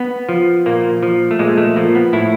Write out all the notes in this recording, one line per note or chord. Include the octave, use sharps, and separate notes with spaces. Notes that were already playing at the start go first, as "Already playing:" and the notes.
Already playing: B3
F3
A#2 A#3
F3
A3
A#2 G#3
A3
F3 A#3
B3
A2 E4